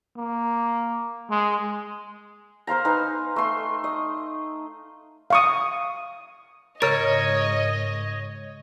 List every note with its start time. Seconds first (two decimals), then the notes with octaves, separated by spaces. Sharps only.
0.17 A#3
1.30 G#3
2.67 A#4 C5 F5 A#5
2.85 D#4 B4 G#5 C6
3.36 A3 C6
3.84 D#5
5.30 F5 C#6 D#6
6.82 G#2 C#3 A#4 C#5 D#5 A6